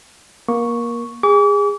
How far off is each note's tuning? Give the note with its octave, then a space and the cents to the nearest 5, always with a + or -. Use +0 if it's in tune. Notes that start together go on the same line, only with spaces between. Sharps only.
A#3 +20 C#6 +0
G#4 -25 D6 -40